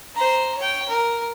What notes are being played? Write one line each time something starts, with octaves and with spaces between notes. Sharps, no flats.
C5 A#5
C#5 G5
A#4